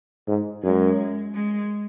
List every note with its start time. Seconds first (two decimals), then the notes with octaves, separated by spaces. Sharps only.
0.28 G#2
0.63 F#2 G#3
1.34 G#3